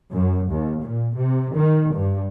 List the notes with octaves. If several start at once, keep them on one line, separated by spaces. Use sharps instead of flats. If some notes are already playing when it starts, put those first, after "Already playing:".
F#2
D#2
A#2
C3
D#3
G2